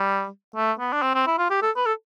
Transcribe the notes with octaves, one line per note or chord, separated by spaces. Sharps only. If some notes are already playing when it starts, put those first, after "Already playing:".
Already playing: G3
A3
B3
D4
C4
C4
E4
F4
G4
A4
B4
A4